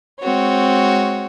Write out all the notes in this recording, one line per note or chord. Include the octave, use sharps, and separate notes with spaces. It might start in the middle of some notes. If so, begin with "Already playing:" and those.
G#3 C4 F#4 C#5